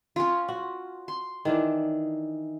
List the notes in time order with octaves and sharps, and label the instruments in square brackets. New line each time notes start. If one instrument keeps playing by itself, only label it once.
[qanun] C#4 F4
[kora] F#4
[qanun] C6
[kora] D#3 E3 D4